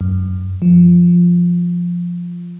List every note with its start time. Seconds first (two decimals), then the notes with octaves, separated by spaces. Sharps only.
0.01 F#2
0.62 F3